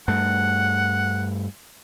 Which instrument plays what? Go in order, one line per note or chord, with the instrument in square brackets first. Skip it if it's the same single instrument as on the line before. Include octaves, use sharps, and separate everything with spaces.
[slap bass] G2 A3 [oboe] F#5